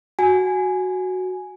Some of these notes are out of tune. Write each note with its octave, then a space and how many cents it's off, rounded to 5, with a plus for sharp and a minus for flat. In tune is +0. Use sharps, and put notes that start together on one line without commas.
F#4 +0 G#5 +5